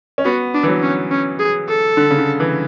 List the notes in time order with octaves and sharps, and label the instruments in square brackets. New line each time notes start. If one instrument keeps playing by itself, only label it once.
[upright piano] C#4
[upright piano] B3 [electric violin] F#4
[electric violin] D4
[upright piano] E3
F#3
[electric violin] C#4
C#4
G#4
A4
[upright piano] D3
C#3
D3
E3